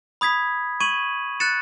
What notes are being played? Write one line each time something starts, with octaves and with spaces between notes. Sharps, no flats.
B5 D#6 G#6 B6
C#6 G#6 D#7 F#7
F#6 A6 C#7 E7